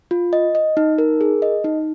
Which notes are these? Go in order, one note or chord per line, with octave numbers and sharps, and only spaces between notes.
F4
D#5
D#5
D#4
A#4
G#4
D#5
D#4